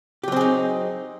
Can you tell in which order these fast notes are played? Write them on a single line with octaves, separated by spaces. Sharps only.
G4 F#3 C4 G#4 D#4